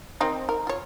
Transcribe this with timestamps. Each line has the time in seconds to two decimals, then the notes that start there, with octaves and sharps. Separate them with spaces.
0.21 D#3 C4 D#4
0.49 A#4
0.67 F4 C#5